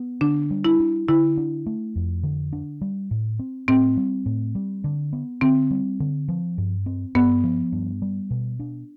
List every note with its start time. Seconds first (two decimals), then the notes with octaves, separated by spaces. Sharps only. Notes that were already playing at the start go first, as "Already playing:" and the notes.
Already playing: B3
0.21 D3 D4
0.51 G3
0.64 E4
0.80 D4
1.08 D3 E4
1.37 D4
1.66 A3
1.96 F2
2.23 D3
2.53 D4
2.81 G3
3.11 A2
3.39 C4
3.68 A2 C4
3.97 G3
4.26 A2
4.55 G3
4.84 D3
5.13 B3
5.41 D3 C4
5.71 G3
6.00 D3
6.28 F3
6.58 G2
6.86 C4
7.15 G2 B3
7.44 F3
7.72 G2
8.02 G3
8.30 B2
8.60 D4